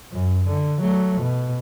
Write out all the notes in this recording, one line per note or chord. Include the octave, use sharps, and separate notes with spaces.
F#2
D3
F#3 A3
B2